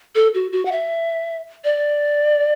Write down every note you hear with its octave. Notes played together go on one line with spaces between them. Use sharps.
A4
F#4
F#4
F#5
E5
D5